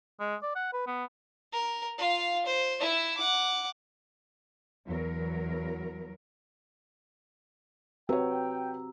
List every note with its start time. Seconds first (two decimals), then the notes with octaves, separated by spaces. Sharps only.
0.20 G#3
0.43 D5
0.55 F#5
0.73 B4
0.87 B3
1.52 A#4
1.98 F4 F5
2.46 C5
2.80 E4 E5
3.17 F#5 D6
4.86 E2 F#3 A#4
8.09 C4 F#4 G4 B4 C#5 G5 A#5 E6